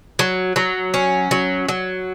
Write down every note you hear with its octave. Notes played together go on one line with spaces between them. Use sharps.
F#3
F#3
C#4
F#3
F#3